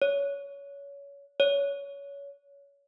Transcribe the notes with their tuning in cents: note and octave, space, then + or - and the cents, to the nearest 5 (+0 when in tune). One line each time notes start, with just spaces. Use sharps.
C#5 +25
C#5 +25